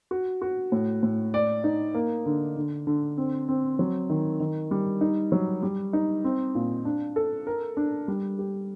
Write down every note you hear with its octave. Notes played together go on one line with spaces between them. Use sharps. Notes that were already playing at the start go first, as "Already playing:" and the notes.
F#4
F#4
A2
A2
D5
D#4
A#3
D3
D3
D3
C4
C4
F#3
D#3
D#3
G3
D#4
F#3
G3
D#4
C4
A#2
D4
A4
A#4
D4
G3
G4